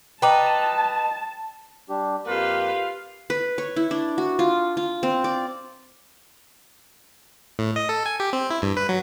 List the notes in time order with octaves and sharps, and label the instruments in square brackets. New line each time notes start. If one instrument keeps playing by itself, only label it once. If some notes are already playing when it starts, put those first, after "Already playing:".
[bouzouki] D#4 B4 [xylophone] G5 A#5 D6 [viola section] A5
[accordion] G3 D4 G4
[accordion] F2 A#3 A#4 [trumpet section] F4 F5 [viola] G4 B4
[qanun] B4
C#5
E4
D4
F#4
F4
F4
C4
D5
[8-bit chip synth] A2
D#5
A4
G#5
G4
C4
E4
G2
B4
F#3